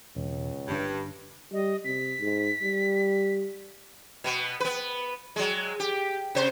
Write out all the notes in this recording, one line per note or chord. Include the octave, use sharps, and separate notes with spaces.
E1 C#2
G1 G2 C#4 D4
G3 D#5
C3 B6
G#2
G3
B2 B3
B3 B4
F#3 G#3
G4
C3 C5